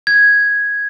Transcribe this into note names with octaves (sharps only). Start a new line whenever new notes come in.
G#6